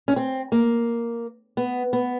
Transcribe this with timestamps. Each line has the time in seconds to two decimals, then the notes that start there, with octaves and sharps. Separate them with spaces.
0.08 C#4
0.16 C4
0.52 A#3
1.57 B3
1.93 B3